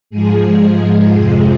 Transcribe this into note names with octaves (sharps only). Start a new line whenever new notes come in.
G#2 F3 G#3 G#4
F2 C3 F3